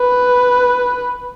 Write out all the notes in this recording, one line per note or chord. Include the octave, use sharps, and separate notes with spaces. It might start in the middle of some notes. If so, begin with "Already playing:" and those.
Already playing: B4